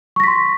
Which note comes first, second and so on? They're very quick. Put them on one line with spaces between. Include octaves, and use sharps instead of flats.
C#6 A#6 B6 C6